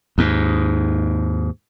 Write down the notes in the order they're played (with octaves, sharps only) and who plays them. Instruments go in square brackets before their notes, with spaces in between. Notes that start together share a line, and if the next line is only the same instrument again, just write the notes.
[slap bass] D#2 G#2